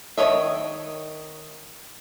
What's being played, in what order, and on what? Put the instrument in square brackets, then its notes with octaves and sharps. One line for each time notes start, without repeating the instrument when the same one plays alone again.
[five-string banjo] D#3 D4 C#5 D#5 E5